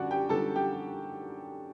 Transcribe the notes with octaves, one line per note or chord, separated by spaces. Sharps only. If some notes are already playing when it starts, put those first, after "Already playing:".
Already playing: F#2 D3 G3 C#4 D4 F#4 D5 F#5
G4 G5
F#2 D3 G3 B3 A4 A5
G4 G5